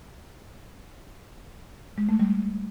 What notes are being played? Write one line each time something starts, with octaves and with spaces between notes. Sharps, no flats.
G#3
A3
G3